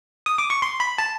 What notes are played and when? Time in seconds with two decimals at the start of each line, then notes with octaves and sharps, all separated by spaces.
0.26 D#6
0.38 D6
0.50 C#6
0.62 C6
0.80 B5
0.98 A5